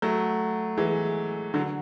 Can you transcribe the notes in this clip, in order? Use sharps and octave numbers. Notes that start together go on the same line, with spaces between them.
F#3 A3
E3 G#3
D3 F#3